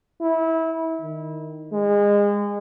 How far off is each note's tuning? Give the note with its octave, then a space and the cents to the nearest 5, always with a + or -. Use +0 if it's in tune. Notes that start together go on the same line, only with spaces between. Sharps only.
E4 -25
D#3 -10
G#3 -30